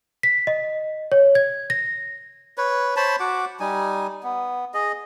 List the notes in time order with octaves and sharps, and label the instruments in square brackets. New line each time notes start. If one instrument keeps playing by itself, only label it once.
[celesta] B6
D#5
C#5
G#6
A#6
[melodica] B4 C#5
C5 C#5 A5 B5
F#4 F#5 D6
G3 D#4 G#5
B3
G#4 D#5